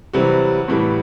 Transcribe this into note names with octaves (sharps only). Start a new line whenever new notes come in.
C3 E3 F#3 G3 F#4
A2 E3 G3